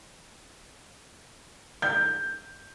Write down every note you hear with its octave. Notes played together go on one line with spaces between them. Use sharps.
G6